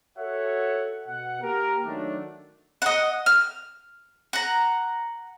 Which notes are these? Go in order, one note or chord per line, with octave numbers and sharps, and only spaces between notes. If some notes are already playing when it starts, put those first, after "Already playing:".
F#4 A4 C#5 E5 F#5
B2 F#5
A#3 G4 A#4
D#3 F#3 A3 D4
D#5 F#5
F6
F#5 A#5